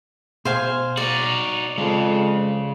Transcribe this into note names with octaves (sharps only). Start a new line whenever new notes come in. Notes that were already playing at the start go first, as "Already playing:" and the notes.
B2 C5 F5 G#5
D#4 F#4 D5
F2 C#3 G#3